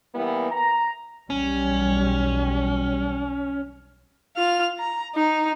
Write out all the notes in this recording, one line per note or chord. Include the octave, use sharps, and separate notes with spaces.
E3 G3 A#3 B3 E4
A#5
B1 E2 G3 C#4
F4 F6
A#5
D#4